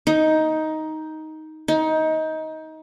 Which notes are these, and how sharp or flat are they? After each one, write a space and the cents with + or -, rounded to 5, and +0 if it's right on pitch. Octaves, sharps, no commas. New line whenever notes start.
D#4 +10
D#4 +20